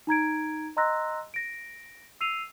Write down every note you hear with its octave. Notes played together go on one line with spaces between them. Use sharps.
D#4 A#5 G#6 D7
D#5 A#5 C6 E6 F#6 A#6
A#6 D7
E6 C7 D#7 F7